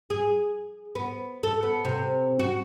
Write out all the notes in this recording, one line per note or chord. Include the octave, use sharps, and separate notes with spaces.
G#4
B3
A4
B3
C3
F#4